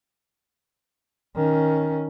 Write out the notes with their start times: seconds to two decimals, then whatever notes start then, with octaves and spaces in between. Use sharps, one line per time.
1.35 D#3 C#4